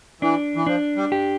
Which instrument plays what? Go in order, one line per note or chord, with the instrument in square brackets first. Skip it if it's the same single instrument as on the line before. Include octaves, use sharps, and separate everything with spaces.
[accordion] E3 [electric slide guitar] D4
[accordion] E3
[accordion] F3 [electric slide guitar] D4
[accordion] G3
[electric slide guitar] G4